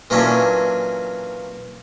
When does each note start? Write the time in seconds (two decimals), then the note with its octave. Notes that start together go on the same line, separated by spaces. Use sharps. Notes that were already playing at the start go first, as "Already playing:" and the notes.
0.10 A#2 E3 F#3 C#4 D4